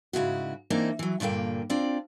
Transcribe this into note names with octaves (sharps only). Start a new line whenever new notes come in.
G#2 C#3 E4 F#4
E3 A#3 C4 D4 D#4
E3 F#3
G2 A#2 D3 A#3 G5
C4 D4 F4 D5